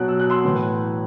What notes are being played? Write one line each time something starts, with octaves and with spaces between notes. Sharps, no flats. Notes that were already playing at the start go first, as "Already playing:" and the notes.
Already playing: B2 F#3 F#6
E6
F#6
C6 E6
A2 E3